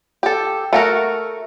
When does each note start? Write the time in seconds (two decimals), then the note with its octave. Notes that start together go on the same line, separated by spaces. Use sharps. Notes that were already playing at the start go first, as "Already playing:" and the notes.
0.23 G4 A4
0.73 A3 F#4 A#4